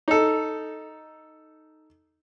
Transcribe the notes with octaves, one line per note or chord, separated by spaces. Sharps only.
D#4 A4